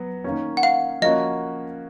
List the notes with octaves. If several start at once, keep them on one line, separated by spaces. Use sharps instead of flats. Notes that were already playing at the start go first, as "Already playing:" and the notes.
Already playing: F#3 B3
D#3 A#3 C#4
F#5
F5
F3 A#3 C#4 F#4 D#5